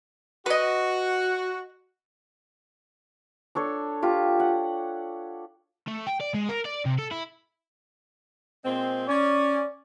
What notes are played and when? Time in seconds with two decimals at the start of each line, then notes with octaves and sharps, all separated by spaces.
0.46 F#4 B4 D#5
3.55 D4 A4 C#5
4.02 F4 G4
4.40 F#5
5.88 A3
6.07 G5
6.21 D5
6.34 G#3
6.49 A#4
6.66 D5
6.86 C3
6.99 A4
7.12 E4
8.64 A#2 G#3 C4
9.08 C#4 D5